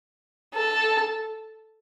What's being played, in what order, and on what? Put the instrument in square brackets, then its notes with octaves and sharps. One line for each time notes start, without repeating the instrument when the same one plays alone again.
[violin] A4